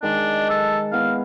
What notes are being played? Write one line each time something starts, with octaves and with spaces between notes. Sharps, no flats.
D#3 G#3 D4
A4
B3 E4 F5